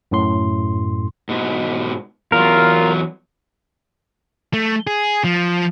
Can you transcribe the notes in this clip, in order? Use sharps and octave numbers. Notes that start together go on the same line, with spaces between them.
F#2 A2 C6
G#2 B2
E2 F#3 F4 A#4
A3
G#4
F3